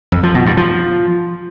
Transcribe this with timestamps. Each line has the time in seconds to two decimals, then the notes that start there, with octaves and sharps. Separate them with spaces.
0.12 F2
0.23 F3
0.35 B2
0.46 G2
0.57 F3